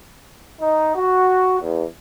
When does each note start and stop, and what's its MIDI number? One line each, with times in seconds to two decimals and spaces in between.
0.61 0.95 63
0.96 1.57 66
1.60 1.85 40